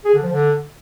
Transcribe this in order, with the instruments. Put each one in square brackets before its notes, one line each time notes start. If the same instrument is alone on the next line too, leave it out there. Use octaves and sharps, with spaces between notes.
[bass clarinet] G#4
D3
F3
D3